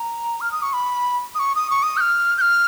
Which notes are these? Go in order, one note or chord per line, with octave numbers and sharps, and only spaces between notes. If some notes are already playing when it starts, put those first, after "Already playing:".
Already playing: A#5
F6
D#6
C#6
B5
D#6
C#6
D#6
C#6
D#6
G6
F6
G6
F6